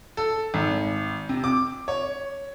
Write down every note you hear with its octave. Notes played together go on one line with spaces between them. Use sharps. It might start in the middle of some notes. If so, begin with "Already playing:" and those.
A4
G#1
C3
D6
C#5